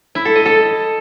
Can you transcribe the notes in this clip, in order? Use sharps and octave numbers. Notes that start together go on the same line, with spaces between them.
E4
A4
D#5
A4